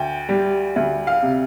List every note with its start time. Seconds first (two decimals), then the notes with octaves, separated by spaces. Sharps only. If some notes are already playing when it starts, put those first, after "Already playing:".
Already playing: D2 G5
0.29 G3
0.76 D2
1.07 F5
1.22 C3